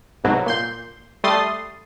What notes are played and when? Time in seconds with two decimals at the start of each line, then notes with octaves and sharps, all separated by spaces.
0.24 C2 G#2 B2 F#3
0.46 A#2 C6 G6
1.24 G3 A3 C6 D#6 A6